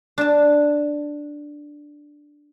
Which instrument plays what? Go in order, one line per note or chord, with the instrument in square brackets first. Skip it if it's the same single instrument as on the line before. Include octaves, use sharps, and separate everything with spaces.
[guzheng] D4 A5